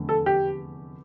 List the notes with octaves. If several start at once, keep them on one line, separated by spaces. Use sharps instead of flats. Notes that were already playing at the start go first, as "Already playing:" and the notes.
Already playing: F1 E2 D3 A3
A4
G4